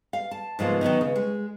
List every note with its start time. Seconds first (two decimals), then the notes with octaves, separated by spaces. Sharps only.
0.13 F5
0.31 A5
0.59 G#2 C#3 F3 A#3 B3 F4
0.81 D#3 F#3 B3 D#4
1.01 C#3
1.16 G#3